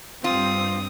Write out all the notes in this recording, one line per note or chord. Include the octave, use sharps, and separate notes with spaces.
G2 C4 F4 D#6